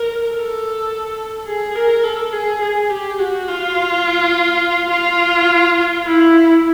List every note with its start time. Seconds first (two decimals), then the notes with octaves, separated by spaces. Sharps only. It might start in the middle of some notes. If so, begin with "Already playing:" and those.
Already playing: A#4
0.32 A4
1.47 G#4
1.75 A#4
2.03 A4
2.32 G#4
2.61 G#4
2.90 G4
3.19 F#4
3.48 F4
4.91 F4
6.05 E4